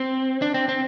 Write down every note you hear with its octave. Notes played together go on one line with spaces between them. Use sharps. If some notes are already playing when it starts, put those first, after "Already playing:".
Already playing: C4
D4
C4
C4